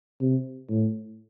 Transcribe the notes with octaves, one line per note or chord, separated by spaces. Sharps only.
C3
A2